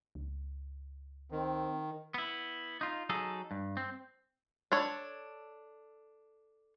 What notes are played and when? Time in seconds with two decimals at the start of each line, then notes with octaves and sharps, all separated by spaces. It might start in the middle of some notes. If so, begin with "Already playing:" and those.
0.15 C#2
1.32 D#3 C4
2.14 B3 E4
2.81 D#4 F4
3.09 F#3 D#4 G#4 A4
3.51 G2
3.77 C4
4.72 D4 A4 C#5